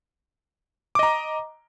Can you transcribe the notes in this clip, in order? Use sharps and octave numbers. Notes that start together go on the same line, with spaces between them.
D#5 A#5 D6